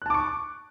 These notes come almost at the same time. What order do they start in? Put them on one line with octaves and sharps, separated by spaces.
F#6 A5 D6 C#6